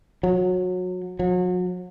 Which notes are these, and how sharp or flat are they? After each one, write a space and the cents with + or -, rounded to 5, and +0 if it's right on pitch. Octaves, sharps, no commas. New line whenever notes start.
F#3 -25
F#3 -35